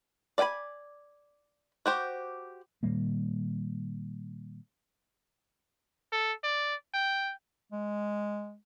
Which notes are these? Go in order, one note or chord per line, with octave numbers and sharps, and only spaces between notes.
D5 E5 G5 G#5 B5
F#4 G4 C5
A#2 D#3 G3 A#3
A4
D5
G5
G#3